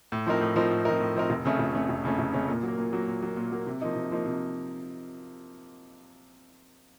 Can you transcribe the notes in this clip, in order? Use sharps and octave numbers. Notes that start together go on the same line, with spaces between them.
A2
F3 C4 D#4 A#4
A2
F3 C4 D#4 A#4
A2
F3 C4 D#4 A#4
A2
F3 C4 D#4 A#4
F1
F2 C#3 A3 C#4
F1
F2 C#3 A3 C#4
F1
F2 C#3 A3 C#4
F1
F2 C#3 A3 C#4
A#2
F#3 A#3
A#2
F#3 A#3
A#2
F#3 A#3
A#2
F#3 A#3
C3
F3 A#3 D#4
C3
F3 A#3 D#4
C3